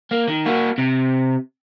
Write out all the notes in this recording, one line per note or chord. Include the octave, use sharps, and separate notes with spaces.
A#3
D#3
A#3 F#4
C3